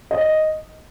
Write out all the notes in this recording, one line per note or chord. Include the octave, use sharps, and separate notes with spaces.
D#5